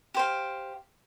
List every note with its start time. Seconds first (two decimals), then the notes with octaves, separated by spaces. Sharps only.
0.14 G4 C5 F5